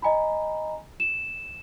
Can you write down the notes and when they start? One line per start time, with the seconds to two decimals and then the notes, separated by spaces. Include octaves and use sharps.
0.02 D#5 G#5 A#5 B5
1.00 E7